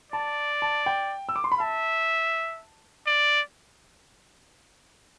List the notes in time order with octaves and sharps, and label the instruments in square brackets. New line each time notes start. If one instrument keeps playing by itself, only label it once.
[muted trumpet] D5 [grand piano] A5
[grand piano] A5
G5
E6
D6
C6
B5
[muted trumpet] E5 [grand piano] A5
[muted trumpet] D5